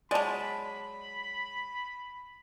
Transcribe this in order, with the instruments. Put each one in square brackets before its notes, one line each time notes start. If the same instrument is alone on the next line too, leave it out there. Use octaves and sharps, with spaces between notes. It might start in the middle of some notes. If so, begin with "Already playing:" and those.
[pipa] F#3 G#3 [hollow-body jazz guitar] D5 A5 [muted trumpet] B5